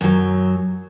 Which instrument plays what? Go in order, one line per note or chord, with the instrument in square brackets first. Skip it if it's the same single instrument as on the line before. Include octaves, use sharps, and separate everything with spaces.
[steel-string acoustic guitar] F#2 F#3